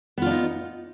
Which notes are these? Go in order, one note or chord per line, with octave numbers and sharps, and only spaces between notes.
B3 D4 D#4 F4